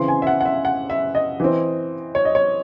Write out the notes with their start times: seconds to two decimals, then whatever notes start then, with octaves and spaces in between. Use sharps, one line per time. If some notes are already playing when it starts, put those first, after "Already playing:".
Already playing: C#3 E3 C4 C6
0.08 G#5
0.22 E5
0.27 F#5
0.41 F#5
0.46 E5
0.65 F#5
0.90 E5
1.15 D#5
1.40 E3 C4
2.15 C#5
2.25 D#5
2.35 C#5